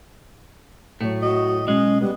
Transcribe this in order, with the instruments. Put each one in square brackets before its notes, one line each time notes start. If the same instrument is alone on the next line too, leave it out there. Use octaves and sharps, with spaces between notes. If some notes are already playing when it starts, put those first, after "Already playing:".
[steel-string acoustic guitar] A2 F#3 [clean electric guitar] A3
[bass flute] F#4 [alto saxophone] D#5
[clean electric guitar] B1 G#3 [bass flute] C#4 [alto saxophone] D#5
[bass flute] G3 [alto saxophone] B3